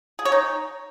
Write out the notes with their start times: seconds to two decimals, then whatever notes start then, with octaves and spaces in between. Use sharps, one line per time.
0.19 G#4
0.25 C#5
0.32 D#4